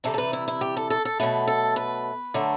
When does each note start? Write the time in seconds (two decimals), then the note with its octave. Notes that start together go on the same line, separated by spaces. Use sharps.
0.04 C3 E3 G3 A4
0.14 A4
0.18 B4
0.33 E4
0.48 E4
0.61 G4
0.77 A4
0.90 A4
1.05 A4
1.20 B2 F#3 A3 B4
1.47 A4
1.76 B4
2.34 D3 F#3 A3